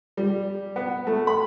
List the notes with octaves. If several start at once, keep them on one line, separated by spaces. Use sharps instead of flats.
G3
B3
A3
B5